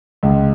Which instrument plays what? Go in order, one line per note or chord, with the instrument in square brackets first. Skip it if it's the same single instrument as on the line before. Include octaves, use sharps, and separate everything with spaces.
[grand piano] C#2